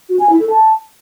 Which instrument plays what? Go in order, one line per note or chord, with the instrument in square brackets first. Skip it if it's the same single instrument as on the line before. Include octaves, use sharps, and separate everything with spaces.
[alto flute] F#4
G#5
E4
A4
A5